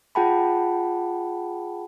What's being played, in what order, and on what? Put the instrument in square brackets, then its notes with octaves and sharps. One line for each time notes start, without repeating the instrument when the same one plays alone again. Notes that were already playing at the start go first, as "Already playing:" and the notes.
[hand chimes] F4 G#4 F#5 G5 A5 B5